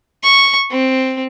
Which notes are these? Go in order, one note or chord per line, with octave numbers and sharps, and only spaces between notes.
C#6
C4